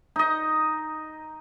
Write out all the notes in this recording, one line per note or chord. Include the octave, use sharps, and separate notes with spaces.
D#4 D#5